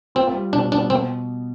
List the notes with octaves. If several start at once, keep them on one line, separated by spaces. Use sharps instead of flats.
C4 F4
G3
B2 D4
B3 D4
B2 C4